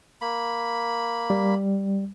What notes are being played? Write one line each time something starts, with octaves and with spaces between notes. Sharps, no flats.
A#3 B5
G3